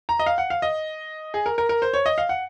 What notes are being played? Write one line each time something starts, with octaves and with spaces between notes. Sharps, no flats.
A#5
D#5
F5
F#5
F5
D#5
G#4
A#4
A#4
A#4
C5
C#5
D#5
F5
F#5